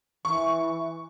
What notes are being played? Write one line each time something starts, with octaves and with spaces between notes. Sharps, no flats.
E3 C#6